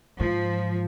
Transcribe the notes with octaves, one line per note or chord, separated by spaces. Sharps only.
G#2 F3